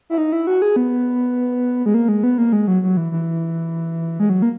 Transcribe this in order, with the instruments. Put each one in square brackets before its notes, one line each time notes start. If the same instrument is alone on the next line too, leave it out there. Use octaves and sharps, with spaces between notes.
[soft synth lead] E4
D#4
E4
F#4
G#4
B3
G#3
A#3
G#3
B3
A#3
G#3
F#3
F#3
E3
E3
G#3
F#3
A#3